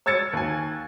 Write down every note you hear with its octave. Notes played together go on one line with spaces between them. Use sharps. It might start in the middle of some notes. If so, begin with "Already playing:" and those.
C#5 E6 G#6 A6 C#7
D#2 G#5